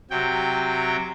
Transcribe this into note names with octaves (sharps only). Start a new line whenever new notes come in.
C3 F#3 G5